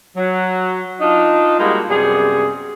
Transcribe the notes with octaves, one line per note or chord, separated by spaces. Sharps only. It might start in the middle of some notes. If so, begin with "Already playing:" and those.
F#3
D4 D#4 F4
G3 G#3 A#3 D#4 F#4 G#4
F#2 C3 G3 B3 G#4